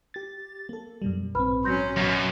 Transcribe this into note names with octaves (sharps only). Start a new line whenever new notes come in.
G4 A6
A#3 A4
F#2 B2 G3
A#1 G#2 C4 B4 B5 F6
F#3 C#4 C6 G6 A#6
F#2 B2